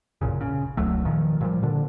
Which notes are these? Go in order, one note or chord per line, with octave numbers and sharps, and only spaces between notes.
A1 F#2 A#2 C#3
C#3
E1 C#2 F#3 A3
A#2 D#3 F3
A#2 F3 G3
A#2 D3 D4